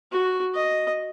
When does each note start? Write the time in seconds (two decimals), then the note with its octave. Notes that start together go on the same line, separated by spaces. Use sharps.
0.12 F#4
0.54 D#5